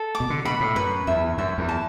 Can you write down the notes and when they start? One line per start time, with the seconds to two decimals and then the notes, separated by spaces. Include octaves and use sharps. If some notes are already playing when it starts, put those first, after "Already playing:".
Already playing: A4
0.15 D6
0.20 B2
0.30 D3
0.45 B2 B5
0.60 A2
0.76 F#2 B4
1.07 E2 E5
1.38 F#2 E5
1.58 E2
1.69 A5